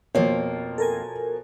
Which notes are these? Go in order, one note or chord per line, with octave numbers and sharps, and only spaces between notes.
F2 B2 F3 A#3 C#5
A4 A#4 G#5